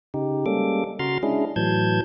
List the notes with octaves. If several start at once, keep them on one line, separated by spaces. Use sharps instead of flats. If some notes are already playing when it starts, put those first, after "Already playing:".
C#3 D#4 G4
G3 G#3 A#3 C#4 A4 D6
C#3 F#4 A#5 C6 F6 A6
G#3 C#4 D4 E4 G#4
A2 E3 F#3 A5 G6 G#6